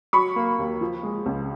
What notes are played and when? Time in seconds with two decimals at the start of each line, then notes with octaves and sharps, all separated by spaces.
0.13 F#3 B5 C#6
0.36 A#3
0.59 D#2
0.81 F3
1.03 G#3
1.26 C#2